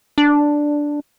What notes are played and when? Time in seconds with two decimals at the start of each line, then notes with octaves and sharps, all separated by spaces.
0.18 D4